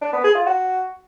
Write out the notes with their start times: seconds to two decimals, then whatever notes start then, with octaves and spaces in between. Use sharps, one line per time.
0.01 D4
0.13 B3
0.24 G#4
0.35 F4
0.46 F#4